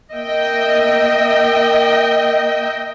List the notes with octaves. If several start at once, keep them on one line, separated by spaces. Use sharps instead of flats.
A#3 D#5 E5 G5